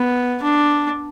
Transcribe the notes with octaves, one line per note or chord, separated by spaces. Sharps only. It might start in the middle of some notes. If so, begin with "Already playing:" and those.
Already playing: B3
D4